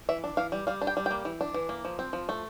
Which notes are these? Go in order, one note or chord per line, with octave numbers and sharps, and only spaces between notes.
E3 E5
D4
E3 F5
G3
G3 F5
D4
G5
G3
A#3 G5
E3
D4
E3
A#3
F3
C4
F3
A3